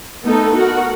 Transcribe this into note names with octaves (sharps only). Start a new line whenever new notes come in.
A3 B3 D#4 A4
F#4 A#4 F#5